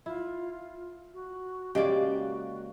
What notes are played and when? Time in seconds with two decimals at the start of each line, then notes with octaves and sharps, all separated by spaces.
0.06 E4 F4
1.14 F#4
1.75 C#3 G#3 A#3 F#4 G4 D5